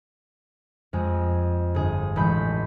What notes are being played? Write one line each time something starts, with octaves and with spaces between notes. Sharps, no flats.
F2 G#3 G#4
G1 G#4
A1 G#3 A3 B5 G6